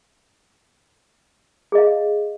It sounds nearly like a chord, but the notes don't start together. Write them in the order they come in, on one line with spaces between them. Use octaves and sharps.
G#4 D#5 F5